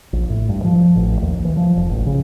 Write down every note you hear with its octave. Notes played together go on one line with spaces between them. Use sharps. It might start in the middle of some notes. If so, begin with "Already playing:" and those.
A#1
A2
G2
F3
A1
D#2
E3
F3
F1
A1
C#3